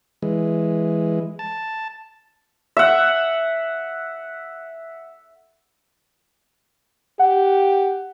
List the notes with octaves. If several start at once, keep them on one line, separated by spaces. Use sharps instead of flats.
E3 G#3
A5
E5 F#5
G4 F#5